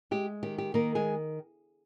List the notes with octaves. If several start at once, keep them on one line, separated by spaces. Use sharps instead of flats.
G#3 G4
D#3 G4
G4
D#3 A#3 A#4
G#3 G#4